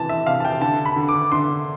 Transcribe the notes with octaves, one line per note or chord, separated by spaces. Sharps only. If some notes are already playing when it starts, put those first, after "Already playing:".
Already playing: C3 E3 A5
E5
C3 F5
A5
G5
D3 A5
B5
D3
D6
D3 C6